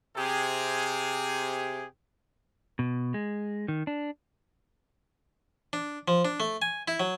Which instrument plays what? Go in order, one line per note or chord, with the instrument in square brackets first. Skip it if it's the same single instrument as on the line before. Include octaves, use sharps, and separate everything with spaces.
[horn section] C3 G4 G#4
[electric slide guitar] B2
G#3
D#3
D4
[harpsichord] D4
F3
D4
A3
G#5
E4
F#3